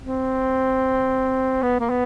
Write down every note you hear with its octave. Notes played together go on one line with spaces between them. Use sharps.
C4
B3
A#3
B3